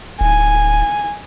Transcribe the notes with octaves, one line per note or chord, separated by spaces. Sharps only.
D1 G#5